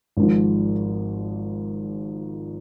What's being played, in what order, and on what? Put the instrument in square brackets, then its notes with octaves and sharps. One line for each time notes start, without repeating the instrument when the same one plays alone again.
[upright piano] G#1 G#2 F3